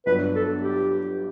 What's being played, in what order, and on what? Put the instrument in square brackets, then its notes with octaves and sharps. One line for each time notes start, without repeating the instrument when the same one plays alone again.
[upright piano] G1 G2 F#3 B3 D4 [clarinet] B4
[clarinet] A4
G4